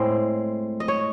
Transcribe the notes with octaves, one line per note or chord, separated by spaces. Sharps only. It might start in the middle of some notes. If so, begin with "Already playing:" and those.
Already playing: A2 G#3 C4 C5
D#5
C#5